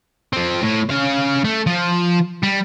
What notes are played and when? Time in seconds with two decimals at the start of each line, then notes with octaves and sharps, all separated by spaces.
0.33 F3 C4
0.63 A2
0.90 C#4 F5
1.44 A3
1.66 F3
2.43 G3